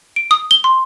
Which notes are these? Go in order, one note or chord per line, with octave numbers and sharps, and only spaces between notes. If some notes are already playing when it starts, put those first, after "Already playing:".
D7
D#6
G7
C6